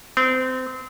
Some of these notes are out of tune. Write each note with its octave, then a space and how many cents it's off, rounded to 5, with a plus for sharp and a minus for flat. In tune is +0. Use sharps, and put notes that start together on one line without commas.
C4 -25